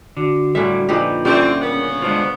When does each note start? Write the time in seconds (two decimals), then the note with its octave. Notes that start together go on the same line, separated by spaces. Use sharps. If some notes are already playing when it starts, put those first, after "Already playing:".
0.17 D3 F#4
0.55 A2 D3 G3 C#4 E5
0.89 A#2 F3 D#4 G4 B4
1.25 D3 E3 G3 C4 C#4 F4
1.62 C#3 B3 A#4
2.02 G#3 D4 F4 C5